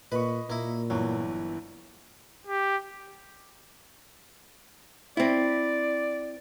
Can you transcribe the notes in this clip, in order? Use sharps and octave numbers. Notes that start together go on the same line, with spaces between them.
A#2 B4 D#5 B5 C#6
A#2 A#3 E4
G1 E3 F#3
G4
C4 E4 D5